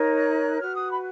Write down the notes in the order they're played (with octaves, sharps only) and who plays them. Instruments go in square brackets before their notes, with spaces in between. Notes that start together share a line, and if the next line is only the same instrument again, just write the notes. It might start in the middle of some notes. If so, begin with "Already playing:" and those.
Already playing: [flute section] D#4 A#4 C#5
F#6
F#4 B4 F6
D#6
B5